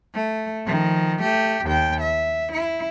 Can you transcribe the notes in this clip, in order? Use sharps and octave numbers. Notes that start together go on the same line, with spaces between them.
A3
D#3 F3
A3 G4
D#2 G5
E5
E4